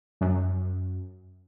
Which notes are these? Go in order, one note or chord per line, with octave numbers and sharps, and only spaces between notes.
F#2